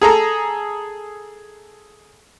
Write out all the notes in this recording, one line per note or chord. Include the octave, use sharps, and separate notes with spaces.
G#4 A4 A#5